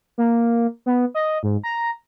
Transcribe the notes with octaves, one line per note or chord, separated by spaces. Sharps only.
A#3
B3
D#5
G#2
A#5